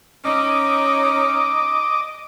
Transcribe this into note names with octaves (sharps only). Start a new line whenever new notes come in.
C#4 D#4 D#5 D6